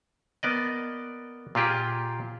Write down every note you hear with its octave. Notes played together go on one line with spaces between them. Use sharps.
A#3 B3 D5 D#5
A#2 F4 G4 G#4